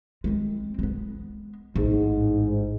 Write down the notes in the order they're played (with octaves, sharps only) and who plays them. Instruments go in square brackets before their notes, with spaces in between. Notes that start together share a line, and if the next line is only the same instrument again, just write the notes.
[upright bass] G#3 C4
G#3 B3
[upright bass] A1 [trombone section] G#2